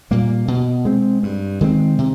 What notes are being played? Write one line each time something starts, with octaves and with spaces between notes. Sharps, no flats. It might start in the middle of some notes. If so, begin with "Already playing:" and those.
A#2 G3 A#3
B2
G#3 C4
G2
D#3 G#3 C4
C3